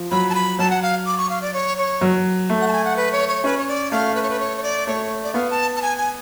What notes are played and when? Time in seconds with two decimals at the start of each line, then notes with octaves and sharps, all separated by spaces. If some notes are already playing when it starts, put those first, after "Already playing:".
Already playing: F3
0.11 F#3 B5
0.30 A5
0.35 B5
0.59 F#3 A5
0.70 F#5
0.82 F5
1.06 D6
1.18 C#6
1.30 F5
1.42 D5
1.54 C#5
1.77 C#5
2.01 F#3
2.49 A3
2.61 F#5
2.68 A5
2.72 G#5
2.84 F#5
2.97 B4
3.12 C#5
3.28 C#5
3.44 C#4 B4
3.57 C#5
3.68 D5
3.91 A3 F5
4.15 B4
4.23 C#5
4.30 B4
4.40 C#5
4.57 C#5
4.63 D5
4.87 A3 C#5
5.23 D5
5.34 B3 F5
5.50 A5
5.76 A5
5.82 G#5
5.98 G#5